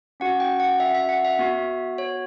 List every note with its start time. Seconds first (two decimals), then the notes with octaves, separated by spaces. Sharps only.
0.20 C#4 F#4 F#5
0.40 G5
0.60 F#5
0.80 E5
0.95 E5
1.09 F#5
1.25 E5
1.39 B3 F#4
1.98 C#5